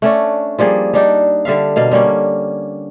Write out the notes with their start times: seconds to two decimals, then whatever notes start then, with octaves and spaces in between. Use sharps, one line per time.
0.02 A3 C#4 D4
0.59 F3 G3 A#3 G#4
0.94 G3 D4 D#4
1.45 D3 G3 E5 F5
1.76 B2 A#3 F5
1.91 D3 G3 A#3 C#4